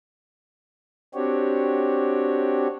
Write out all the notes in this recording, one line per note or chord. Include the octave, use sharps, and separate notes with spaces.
C4 D4 F#4 G4 C#5